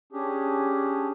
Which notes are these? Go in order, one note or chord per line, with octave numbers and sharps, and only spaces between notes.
C#4 D4 G4 G#4